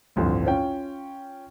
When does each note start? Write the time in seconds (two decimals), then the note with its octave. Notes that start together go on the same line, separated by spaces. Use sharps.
0.16 A1 D2 G2 F3 C4
0.47 C#4 F4 G5